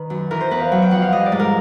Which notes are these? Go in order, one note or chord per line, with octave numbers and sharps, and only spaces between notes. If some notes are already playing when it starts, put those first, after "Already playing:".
Already playing: D#3 B4
F#2
E3 A#4
C5
E2 B4
F5
F#3 F#5
G5
F2 F#5
F5
G3 D#5
D5
G#2
A#4